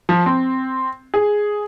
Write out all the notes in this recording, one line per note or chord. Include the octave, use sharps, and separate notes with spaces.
F3
C4
G#4